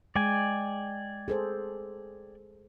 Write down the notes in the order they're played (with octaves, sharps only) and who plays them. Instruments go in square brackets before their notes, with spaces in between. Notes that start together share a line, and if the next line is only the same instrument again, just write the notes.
[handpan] G#3 [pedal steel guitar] D5 G5 G#5
[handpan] G#4 A4 C5